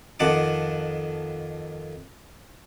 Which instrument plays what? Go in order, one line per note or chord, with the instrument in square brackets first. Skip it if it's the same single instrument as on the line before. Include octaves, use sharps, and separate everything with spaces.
[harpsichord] F2 D#3 F#5 A5 D6